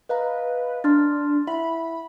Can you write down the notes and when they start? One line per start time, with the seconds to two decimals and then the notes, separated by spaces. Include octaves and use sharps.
0.09 B4 D#5 F5 A#5
0.84 D4 C6 F6 A6
1.47 E4 E5 F#5 B5